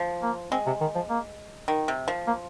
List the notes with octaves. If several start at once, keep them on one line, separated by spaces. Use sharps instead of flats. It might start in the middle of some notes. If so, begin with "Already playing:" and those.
Already playing: F3
A#3
G#3 C4
C3
D#3
F3
A#3
D#3
C3
F3
A#3